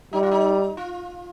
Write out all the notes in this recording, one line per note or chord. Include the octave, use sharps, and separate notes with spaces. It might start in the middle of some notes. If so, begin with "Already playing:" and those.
G3 D#4
F4
D#4
F4